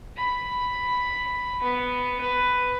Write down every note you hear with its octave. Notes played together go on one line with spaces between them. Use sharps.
B5
B3
B4